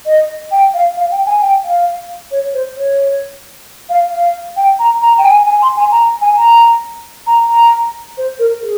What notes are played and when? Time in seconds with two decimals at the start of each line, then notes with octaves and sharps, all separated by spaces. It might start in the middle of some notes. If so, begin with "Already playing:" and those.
0.06 D#5
0.51 G5
0.74 F5
0.97 F5
1.12 G5
1.26 G#5
1.42 G5
1.64 F5
2.31 C#5
2.54 C5
2.77 C#5
3.89 F5
4.11 F5
4.57 G5
4.79 A#5
5.02 A#5
5.18 G5
5.25 G#5
5.47 G#5
5.62 C6
5.76 G#5
5.92 A#5
6.21 G#5
6.37 A#5
7.27 A#5
7.49 A#5
8.18 C5
8.39 A#4
8.62 G#4